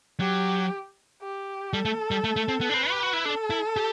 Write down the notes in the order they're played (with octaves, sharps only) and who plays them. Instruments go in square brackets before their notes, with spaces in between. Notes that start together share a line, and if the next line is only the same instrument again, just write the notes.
[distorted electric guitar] F#3 [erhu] G4
[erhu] G4
[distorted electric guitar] G3 [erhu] A4
[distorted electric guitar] A3
G3
A3
A3
C4
B3
D4
[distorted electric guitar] C4 [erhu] B4
[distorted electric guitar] G4
F#4
E4
[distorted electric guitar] D4 [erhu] A4
[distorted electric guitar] E4
G4